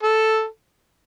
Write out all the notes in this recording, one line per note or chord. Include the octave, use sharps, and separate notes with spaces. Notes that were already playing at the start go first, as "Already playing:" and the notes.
A4